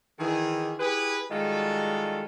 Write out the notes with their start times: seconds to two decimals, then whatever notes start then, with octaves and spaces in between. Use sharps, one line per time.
0.20 D#3 E3 G#4
0.80 E4 G4 G#4 B4
1.31 D#3 G3 G#3 F4 F#4 A4